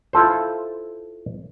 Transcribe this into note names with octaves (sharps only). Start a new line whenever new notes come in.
E4 F4 A4 C5